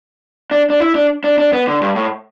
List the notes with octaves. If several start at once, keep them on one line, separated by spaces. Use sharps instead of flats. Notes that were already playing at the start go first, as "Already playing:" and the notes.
D4
D4
E4
D4
D4
D4
B3
D3
G2
A2